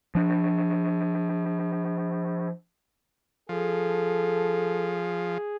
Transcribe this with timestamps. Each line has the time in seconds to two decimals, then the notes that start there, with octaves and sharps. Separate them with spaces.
0.15 F3 D4
3.49 F3 G#4 A4